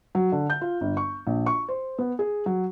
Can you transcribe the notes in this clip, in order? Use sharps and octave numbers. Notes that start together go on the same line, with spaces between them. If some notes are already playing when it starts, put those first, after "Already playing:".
F#3
D3
G6
F4
G1
C#6
A#1
C#6
C5
B3
G#4
F#3